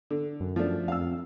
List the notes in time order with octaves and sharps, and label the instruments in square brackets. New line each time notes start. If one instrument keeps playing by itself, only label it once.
[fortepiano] D3
[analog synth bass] F#2
[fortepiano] F3 A3 D4
[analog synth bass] F2 [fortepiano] F5 E6